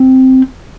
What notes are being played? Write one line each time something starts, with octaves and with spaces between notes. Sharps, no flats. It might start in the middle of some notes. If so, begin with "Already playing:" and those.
Already playing: C4